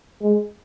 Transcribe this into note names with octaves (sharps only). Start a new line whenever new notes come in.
G#3